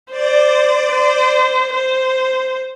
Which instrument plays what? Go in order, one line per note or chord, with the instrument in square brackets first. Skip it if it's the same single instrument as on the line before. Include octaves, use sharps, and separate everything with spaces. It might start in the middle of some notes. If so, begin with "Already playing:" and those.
[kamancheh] C5 [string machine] D5
[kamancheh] C5
C5